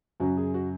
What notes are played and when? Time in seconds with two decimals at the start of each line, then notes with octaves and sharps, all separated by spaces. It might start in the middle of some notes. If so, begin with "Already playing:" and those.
0.20 F#2 C#3 F#3 C#4 F#4
0.37 G#4
0.54 F#4